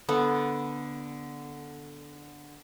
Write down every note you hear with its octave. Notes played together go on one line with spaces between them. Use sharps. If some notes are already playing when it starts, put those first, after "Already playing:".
D3 B3 A4